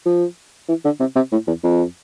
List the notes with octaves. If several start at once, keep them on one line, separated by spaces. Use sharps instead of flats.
F3
E3
D3
C3
C3
A2
E2
F2